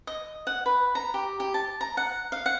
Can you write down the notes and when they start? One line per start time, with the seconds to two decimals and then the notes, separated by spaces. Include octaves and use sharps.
0.07 D#5
0.47 F#5
0.66 B4
0.95 A#5
1.14 G4
1.40 G4
1.54 A5
1.81 A#5
1.97 F#5
2.32 F5
2.46 F#5